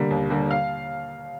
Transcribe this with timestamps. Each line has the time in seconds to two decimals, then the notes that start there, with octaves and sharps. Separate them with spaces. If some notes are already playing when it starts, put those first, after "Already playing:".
Already playing: D3 G3 A#3
0.11 D#2
0.30 D3 G3 A#3
0.51 F5